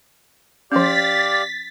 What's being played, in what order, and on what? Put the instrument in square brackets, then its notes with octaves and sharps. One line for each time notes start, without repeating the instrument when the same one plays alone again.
[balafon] F3 C#4 [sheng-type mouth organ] G4 D5 F5 [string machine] A6 B6